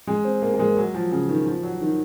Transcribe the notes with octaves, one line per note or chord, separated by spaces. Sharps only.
G#3
C4
A#3
A#3
G#3
F#3
F3
C#3
D#3
F3
F#3
D#3